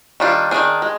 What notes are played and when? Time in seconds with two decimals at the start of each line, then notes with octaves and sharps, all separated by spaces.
0.20 D#3 G3 D4 F4
0.51 D#3 G#3 D4 G#4
0.82 G#3